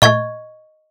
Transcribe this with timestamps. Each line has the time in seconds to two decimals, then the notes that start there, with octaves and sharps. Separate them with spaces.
0.02 A#2 A3 D#5 C#6 G#6